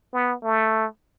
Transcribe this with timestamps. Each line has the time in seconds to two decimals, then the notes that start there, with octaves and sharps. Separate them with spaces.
0.13 B3
0.43 A3